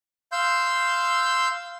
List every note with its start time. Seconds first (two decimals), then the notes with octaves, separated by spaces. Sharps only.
0.32 F5 C6 E6 G6